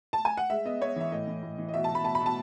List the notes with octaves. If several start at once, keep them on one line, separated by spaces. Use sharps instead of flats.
A5
G#5
F#5
G#3 E5
B3 D#5
B3 C#5
E3 E5
A2 D#5
E3
A2
E3
D#5
B2 E5
A5
B2
B5
B2 A5
B5
B2
A5